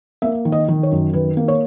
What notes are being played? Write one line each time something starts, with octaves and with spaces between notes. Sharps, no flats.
A#3 E5
D#3
D#5
D#3
C#5
F#2
D#3 B4
A#3
C#5